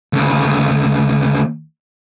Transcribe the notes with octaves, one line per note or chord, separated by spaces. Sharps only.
D2 C#3